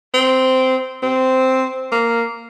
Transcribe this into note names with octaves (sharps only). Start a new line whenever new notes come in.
C4
C4
A#3